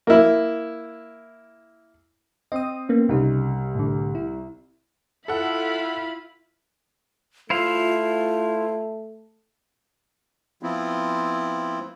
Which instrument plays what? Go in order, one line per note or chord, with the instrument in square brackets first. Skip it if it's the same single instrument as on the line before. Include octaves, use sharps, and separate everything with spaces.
[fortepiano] A#3 E4
[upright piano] C4 [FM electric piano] D#5 D#6
[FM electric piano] A#3 B3 C#4
[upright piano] C2 [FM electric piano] C#3 D#4
[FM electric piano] A2 D3
E4
[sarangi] E4 [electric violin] F4 B5 [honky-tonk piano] A4 F#5
[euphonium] A3 [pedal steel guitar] E4 C5 F5 [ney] F4
[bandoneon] F3 B3 C4 E4 F4